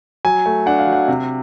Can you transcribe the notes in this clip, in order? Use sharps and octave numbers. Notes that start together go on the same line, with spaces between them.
F#3 G#5
A3
D4 F#5
F5
F#3
F#5
C3